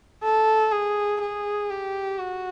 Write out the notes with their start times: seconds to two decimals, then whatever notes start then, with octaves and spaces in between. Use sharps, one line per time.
0.24 A4
0.72 G#4
1.21 G#4
1.70 G4
2.19 F#4